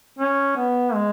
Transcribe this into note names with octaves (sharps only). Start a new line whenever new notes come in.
C#4
B3
G#3